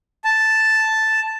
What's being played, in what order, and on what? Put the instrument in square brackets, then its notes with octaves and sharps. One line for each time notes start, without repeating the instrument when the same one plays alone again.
[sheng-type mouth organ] A5